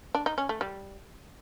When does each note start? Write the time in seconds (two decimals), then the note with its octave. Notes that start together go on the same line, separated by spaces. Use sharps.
0.15 D4
0.26 D#4
0.38 C#4
0.49 A3
0.61 G3